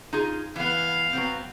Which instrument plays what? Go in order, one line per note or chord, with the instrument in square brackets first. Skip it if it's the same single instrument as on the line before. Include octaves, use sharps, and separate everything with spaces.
[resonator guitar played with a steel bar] D#4 F4 G#4
[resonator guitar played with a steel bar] E3 B3 [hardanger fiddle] F5
[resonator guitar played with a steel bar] F#3 B3 C4